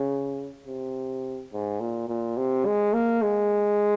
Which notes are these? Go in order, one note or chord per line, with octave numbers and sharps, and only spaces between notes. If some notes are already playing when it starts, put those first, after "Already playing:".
Already playing: C#3
C3
G#2
A#2
A#2
C3
G#3
A#3
G#3